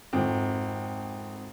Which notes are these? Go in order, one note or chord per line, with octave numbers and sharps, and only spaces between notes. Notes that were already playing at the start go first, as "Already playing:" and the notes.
G#1 F2